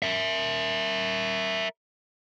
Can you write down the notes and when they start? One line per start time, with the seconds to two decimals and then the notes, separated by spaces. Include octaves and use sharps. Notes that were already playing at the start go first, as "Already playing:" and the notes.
0.02 A#4 E5